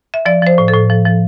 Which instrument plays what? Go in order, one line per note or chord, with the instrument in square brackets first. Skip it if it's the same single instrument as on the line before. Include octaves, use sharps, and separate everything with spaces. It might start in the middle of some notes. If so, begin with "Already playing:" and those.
[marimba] E5
F3 D5
F3 C5
A2
A4
A2
F3
F3